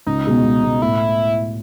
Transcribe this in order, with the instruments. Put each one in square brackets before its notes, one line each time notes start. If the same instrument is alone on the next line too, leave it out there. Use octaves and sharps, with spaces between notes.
[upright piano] C#2 [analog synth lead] D#4
[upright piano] B2 G#3 B3
C#2
B2 G#3 B3
[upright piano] A2 [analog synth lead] E4